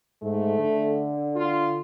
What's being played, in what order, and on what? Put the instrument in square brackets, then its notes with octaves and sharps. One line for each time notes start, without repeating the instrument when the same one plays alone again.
[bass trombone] G#2 [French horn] A3
[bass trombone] D3
[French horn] F4